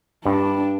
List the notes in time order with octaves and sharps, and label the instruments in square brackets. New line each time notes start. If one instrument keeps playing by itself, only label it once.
[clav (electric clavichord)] G2 [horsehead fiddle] D4